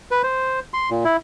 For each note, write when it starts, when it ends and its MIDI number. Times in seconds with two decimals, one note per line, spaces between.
0.11 0.22 71
0.23 0.60 72
0.74 0.90 84
0.90 1.04 46
1.05 1.17 64